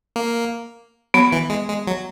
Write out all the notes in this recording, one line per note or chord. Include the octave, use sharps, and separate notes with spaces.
A#3
F#3 B3
E3
G#3
G#3
F#3